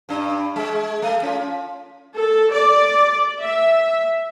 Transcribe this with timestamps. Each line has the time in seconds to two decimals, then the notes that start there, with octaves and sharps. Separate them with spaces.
0.09 G2 D4
0.56 G#3
1.02 A3
1.22 C#4 F4
2.15 A4
2.53 D5
3.41 E5